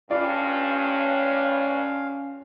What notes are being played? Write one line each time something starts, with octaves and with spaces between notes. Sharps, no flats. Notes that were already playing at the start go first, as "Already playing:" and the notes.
G2 C#4 F4 D5 F5